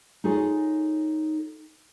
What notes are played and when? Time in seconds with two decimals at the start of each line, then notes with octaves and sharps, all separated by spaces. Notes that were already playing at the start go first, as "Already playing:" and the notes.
0.24 D#4 F4 G#4 A4 C#5